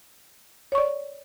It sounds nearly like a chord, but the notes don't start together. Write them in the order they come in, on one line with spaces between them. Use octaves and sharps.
C#5 C#6 D5